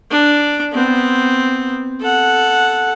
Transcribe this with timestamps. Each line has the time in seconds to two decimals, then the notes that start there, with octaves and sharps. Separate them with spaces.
0.11 D4
0.72 B3 C4
2.01 A4 F#5